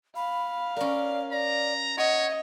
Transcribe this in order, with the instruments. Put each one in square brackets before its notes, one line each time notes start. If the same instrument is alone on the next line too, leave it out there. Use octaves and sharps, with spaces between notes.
[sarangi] F5 [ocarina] B5
[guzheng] C#4 A#4 [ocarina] D5
[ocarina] D5 [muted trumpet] A#5
[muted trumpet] C#5 [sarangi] D#5 [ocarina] F#5